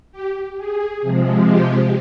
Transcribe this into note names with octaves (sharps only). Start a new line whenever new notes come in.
G4
G#4
C3 F3 G#3
G4